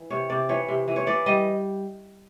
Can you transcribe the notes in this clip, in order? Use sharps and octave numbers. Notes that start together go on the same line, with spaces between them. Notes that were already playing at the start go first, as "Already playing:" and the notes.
Already playing: E3
C3 C#5
C3 D5
E3 C#5
C3
E3
C#5
E3 D5
G3 D#5